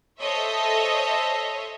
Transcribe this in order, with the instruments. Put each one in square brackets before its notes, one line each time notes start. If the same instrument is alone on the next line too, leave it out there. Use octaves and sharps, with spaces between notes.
[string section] A4 C5 C#5 D#5 E5